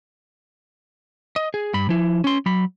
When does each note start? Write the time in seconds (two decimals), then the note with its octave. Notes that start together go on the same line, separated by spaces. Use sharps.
1.36 D#5
1.54 G#4
1.74 G2 B5
1.89 F3 E4
2.24 C#4 C6
2.46 F#3 B5